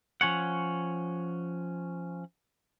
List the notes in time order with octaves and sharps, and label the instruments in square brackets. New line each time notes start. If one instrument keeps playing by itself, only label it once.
[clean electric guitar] F3 C#4 C#5 F#5